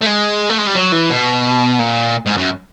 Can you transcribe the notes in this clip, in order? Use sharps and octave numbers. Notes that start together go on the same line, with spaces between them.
A3
G#3
A3
G#3
G3
F#3
E3
B2
A#2
G#2
F#2